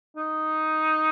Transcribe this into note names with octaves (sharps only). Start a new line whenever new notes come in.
D#4